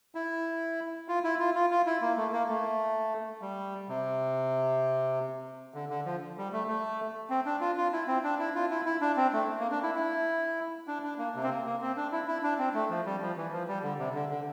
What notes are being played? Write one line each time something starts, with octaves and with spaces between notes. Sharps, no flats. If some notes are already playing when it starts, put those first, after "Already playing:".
E4
F4
E4
F4
F4
F4
E4
A#3
A3
A#3
A3
G3
C3
D3
D3
F3
G3
A3
A3
C4
D4
F4
F4
E4
C4
D4
E4
F4
E4
E4
D4
C4
A3
A#3
D4
E4
E4
D4
D4
A#3
C3
C4
A#3
A#3
C4
D4
E4
E4
D4
C4
A3
F3
G3
F3
E3
F3
G3
D3
C3
D3
D3